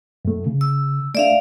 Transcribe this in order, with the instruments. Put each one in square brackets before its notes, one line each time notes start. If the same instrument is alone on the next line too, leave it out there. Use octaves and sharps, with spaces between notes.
[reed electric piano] F#2 A3
C#3
[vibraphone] E6
[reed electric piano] A3 D4 [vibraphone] D5 E5 F5